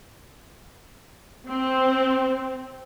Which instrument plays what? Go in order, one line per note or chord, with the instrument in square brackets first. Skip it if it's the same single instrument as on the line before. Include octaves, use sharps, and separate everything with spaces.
[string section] C4